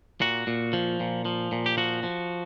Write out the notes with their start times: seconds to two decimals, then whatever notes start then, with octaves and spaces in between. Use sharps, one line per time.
0.21 A#2 F#4
0.47 A#2
0.73 F3
1.00 A#2
1.25 F3
1.52 A#2
1.66 G4
1.77 F3 F#4
2.03 F3